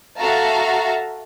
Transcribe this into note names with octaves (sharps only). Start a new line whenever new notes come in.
F#4 A4 E5 F5 A5 A#5